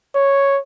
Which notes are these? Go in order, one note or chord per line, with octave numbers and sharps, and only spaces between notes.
C#5